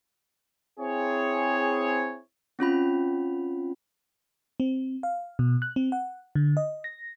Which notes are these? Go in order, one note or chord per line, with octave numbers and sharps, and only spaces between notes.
C4 E4 G#4 C#5
C4 C#4 F4 B5
C4
F5
B2
F#6
C4
F#5
D3
D#5
A#6